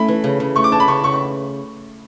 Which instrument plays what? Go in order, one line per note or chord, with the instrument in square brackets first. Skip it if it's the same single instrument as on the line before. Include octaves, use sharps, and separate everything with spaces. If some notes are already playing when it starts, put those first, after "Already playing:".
Already playing: [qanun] A3 C#4 E4 [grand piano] B5
[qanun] E3
C#3
C#3
[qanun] A3 [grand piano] C#6
[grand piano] D6
[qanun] E3 [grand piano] A5
[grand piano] B5
[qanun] C#3 [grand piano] C#6
[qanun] C#3 [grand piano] C#6
[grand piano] C#6